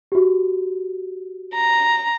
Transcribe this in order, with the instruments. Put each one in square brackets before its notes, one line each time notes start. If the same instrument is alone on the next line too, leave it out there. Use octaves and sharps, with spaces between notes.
[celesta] F#4 G4
[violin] A#5